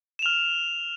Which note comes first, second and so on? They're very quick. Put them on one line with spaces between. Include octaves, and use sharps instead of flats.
E7 F7 F6